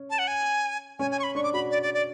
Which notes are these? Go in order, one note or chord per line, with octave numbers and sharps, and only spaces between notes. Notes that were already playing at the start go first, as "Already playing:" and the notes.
Already playing: C#4
A5
F#5
G#5
C#4 G#5
G#5
C#6
B5
D4 C#6
D6
F#4 B5
D5
D5
D5